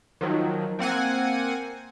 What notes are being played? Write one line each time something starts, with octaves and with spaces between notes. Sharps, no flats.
D#3 F3 F#3
A#3 C4 F#5 G#5